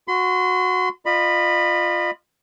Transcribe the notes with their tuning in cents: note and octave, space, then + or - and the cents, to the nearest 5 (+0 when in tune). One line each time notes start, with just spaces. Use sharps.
F#4 -15 C6 -35
F4 +0 D#5 -40 B5 +0